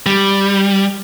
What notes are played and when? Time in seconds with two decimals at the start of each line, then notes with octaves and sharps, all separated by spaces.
0.06 G3